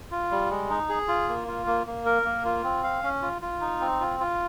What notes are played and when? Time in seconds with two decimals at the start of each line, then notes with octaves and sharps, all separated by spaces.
0.11 F4
0.31 G3
0.50 G#3
0.70 D#4
0.89 G#4
1.08 F4
1.29 A#3
1.48 F4
1.67 A#3
1.86 A#3
2.06 A#4
2.25 A#3
2.45 F4
2.64 C4
2.83 F5
3.03 C#4
3.22 F4
3.42 F4
3.61 D#4
3.81 C4
4.00 F4
4.20 F4